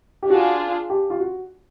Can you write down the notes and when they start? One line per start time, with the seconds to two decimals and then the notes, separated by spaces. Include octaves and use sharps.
0.23 G4
0.30 D4 F4 F#4 G#4
0.90 G4
1.10 F4
1.20 F#4